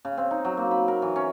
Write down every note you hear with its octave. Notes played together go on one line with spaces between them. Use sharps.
C#3
C4
D#4
F#3
A#3
B5
A#4
E3
C#4